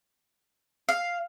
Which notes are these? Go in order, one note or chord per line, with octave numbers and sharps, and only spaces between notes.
F5